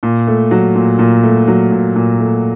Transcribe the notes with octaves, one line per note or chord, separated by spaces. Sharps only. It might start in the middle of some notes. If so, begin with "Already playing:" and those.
A#2
A3
F#3
A#2
A#2
A3
F#3
A#2
A#2
A3